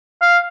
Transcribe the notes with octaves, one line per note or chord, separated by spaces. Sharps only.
F5